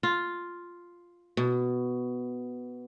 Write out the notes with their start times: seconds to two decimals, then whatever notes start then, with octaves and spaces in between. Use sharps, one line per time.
0.03 F4
1.37 B2